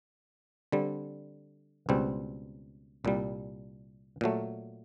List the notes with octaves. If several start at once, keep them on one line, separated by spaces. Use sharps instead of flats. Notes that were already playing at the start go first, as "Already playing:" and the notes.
D3 G3 C4
C#2 B2 G3 C4
C2 A#2 G3
A#2 F#3 A3